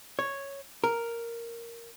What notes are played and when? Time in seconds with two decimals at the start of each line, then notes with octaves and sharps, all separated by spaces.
0.19 C#5
0.84 A#4